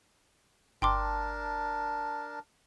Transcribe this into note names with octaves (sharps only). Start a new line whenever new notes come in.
G1 D4 A#4 G5 A5 C6 D6